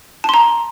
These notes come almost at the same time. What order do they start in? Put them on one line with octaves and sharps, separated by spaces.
A5 C6 A#5